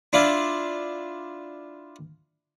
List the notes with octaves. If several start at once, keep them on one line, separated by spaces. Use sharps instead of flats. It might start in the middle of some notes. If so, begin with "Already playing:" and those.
D4 E4 F4